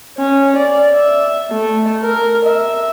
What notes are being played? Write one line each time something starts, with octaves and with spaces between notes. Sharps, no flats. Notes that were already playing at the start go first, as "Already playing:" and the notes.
C#4
D5
E5
A3
A#4
E5